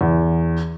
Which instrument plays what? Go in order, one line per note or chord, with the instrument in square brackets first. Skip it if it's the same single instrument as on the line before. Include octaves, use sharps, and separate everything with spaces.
[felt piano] E2